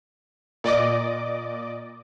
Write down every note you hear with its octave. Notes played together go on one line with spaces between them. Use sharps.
A#2 D5 D#5 D6